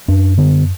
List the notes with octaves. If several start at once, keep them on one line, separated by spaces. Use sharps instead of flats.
F#2 D4
D3 B3